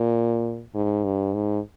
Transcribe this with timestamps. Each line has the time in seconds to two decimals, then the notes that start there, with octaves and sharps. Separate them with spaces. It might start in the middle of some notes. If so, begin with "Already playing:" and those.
Already playing: A#2
0.74 G#2
1.04 G2
1.33 G#2